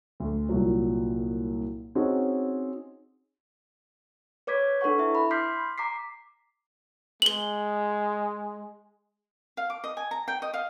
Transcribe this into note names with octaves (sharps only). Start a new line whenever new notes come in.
D2
C2 A#2 F#3
C4 C#4 D#4 F#4 G#4
B4 C#5 D6 G#6 B6
D4 A4 B4 F#5 C#6
E4 E5
B5
C6 D6 F6 G6 B6 C7
A#5 D6 B6 C7
G#3 F#7 G7
F5
D6
D#5
G#5
A#5
G5
D#5
F5